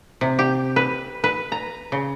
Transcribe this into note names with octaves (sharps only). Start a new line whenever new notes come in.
C3
G4
B4
B4
A#5
C#3